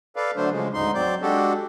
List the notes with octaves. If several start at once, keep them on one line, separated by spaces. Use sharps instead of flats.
A4 B4 D5 F5
D3 F#3 A3 D4 C5
C#3 F3 G#3
D2 G#2 D#4 C6
F#3 C4 D5 G6
G#3 D4 F#4 G4 A4